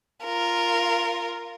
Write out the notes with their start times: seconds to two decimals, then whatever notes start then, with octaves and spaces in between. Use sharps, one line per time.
0.25 F4 A#4